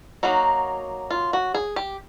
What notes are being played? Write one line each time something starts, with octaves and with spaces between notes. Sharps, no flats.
F#3 A#3 D#4 F#4
F4
F#4
G#4
G4